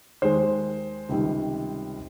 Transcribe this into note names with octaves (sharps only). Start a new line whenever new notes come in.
D#2 D#3 G#3 C5
C#2 C3 D#3 G3